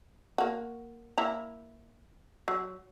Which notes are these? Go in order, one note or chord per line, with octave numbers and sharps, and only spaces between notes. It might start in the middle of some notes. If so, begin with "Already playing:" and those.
A#3 F#4
A#3 E4 A#5
F#3